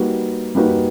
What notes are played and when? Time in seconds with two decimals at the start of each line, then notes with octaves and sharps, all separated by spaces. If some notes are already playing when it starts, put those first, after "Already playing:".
Already playing: G3 A#3 D#4 F#4 B4
0.55 G3 A#3 D#4 F#4 B4